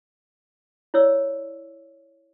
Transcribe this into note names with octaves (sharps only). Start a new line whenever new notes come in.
E4 C#5 D5 E6